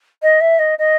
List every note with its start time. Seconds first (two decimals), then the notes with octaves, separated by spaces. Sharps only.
0.23 D#5
0.41 E5
0.59 D#5
0.79 D#5